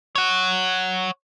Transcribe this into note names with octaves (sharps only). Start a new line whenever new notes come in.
C#5 F#5